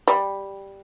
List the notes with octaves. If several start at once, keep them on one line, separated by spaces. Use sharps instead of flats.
G3